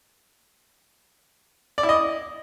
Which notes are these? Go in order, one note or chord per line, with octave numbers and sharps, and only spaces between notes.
D5
E4
D#5